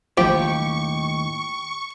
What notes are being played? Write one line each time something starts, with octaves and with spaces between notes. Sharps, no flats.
D#2 A2 F3 G4 C#6